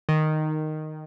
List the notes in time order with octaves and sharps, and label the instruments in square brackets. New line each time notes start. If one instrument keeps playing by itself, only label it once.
[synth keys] D#3